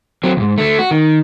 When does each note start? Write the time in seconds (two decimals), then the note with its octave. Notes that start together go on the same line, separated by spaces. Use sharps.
0.23 F#3 C4
0.37 D2 G#2
0.58 D3 A3
0.79 F#4
0.91 D#3